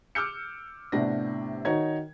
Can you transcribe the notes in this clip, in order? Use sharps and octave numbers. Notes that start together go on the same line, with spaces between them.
D6 E6 F6 G6 C#7
A2 C3 B3 D4 A#6
D#3 D#4 F#4 C#5 A#5 G#6